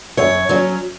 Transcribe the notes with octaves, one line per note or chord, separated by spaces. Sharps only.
F#2 C#5
F#3 C#4